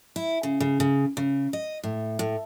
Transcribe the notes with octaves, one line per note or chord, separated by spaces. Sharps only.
E4
C#3
C#3
C#3
C#3
D#5
A2
A2